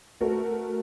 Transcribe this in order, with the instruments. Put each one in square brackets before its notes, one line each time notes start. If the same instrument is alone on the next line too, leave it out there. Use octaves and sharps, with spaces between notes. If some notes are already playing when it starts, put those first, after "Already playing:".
[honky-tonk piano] A3 F#4 A4 A#4